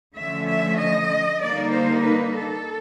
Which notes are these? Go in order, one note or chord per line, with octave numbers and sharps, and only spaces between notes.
D3 F3 A3 C#4 E5
E5
D#5
D3 G3 A#3 D#4 D5
C5
B4
A4